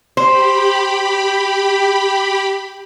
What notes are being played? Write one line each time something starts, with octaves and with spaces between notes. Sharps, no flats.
G4 C5 B5